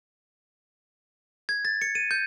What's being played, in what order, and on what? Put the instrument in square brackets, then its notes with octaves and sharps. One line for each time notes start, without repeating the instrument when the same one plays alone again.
[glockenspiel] G#6
A6
C#7
D#7
G6